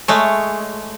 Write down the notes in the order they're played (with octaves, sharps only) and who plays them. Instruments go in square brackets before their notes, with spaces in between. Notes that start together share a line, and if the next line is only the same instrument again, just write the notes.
[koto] G#3 A3 C#5